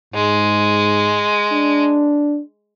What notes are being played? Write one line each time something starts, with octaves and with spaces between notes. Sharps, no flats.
G#2 G#3
D4